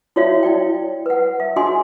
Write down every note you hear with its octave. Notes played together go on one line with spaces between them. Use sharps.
E4 F#4 C#5 D5 E5 F5
E4 D5 G5
B4 F#5
E5
D4 F#4 G#4 D#5 G#5 C6